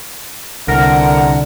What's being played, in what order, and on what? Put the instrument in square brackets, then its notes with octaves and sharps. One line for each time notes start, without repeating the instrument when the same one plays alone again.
[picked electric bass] C2 [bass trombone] D3 [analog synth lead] A#4 [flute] F#5